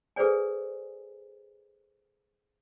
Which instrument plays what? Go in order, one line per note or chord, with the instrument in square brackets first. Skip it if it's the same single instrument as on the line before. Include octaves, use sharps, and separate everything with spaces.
[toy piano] G#4 A4 B4 C5 D5 G#5